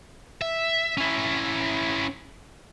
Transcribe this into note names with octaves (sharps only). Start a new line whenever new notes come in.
E5
C#4 E4